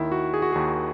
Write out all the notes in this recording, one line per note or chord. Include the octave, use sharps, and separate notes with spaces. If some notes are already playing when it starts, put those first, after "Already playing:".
Already playing: D#2 D#3 E4
F#4
G#4
F#4
D#2 D#3 G#4